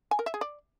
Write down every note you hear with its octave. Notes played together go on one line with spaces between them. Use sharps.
G#5
A#4
E5
G#4
D5